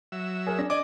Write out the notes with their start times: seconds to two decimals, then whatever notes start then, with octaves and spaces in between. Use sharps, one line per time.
0.12 F#3 E5
0.47 G#4 A#4
0.58 D4 A#6
0.70 D5 D#5 G#5 D6